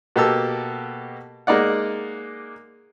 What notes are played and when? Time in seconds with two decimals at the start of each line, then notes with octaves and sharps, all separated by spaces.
0.16 B2 A#3 G4 A4 E6
1.47 G#3 A#3 D#4 D5 F#5